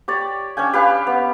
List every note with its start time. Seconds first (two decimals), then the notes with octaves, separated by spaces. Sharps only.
0.08 G4 C#5 D5
0.57 C#4 D4 G5 G#5
0.73 G4 B4 F5
1.07 B3